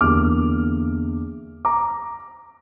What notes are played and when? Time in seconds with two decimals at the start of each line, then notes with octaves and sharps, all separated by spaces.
0.01 E2 D3 G3 A#3 D6 F6
1.65 A#5 D6